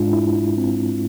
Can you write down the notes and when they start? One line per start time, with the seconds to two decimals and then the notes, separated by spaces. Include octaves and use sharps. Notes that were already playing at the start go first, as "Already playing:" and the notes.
Already playing: G#2 G#3 D4 F4
0.13 E4
0.36 E4
0.57 C4